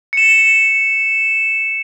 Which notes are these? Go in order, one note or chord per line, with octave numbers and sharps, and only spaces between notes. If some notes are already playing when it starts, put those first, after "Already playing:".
C#7 E7